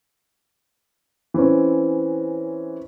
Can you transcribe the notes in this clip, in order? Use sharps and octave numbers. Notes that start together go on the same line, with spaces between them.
E3 C4 C#4